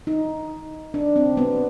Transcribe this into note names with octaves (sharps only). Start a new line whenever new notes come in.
D#4
D4
C4
B3